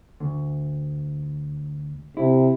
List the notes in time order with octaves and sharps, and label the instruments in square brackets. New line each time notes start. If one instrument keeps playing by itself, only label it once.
[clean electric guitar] D2
[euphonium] C3 [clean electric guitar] E4